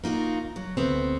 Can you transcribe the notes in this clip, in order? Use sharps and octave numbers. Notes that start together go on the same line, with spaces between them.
A#3 D#4 F4 F#4
F#3
D2 B3 C4